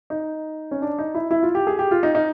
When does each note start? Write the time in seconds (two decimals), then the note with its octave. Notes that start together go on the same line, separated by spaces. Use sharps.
0.10 D#4
0.71 C#4
0.82 D4
0.99 D#4
1.15 E4
1.31 E4
1.43 F4
1.55 G4
1.67 G#4
1.79 G4
1.91 F4
2.03 D#4
2.15 D#4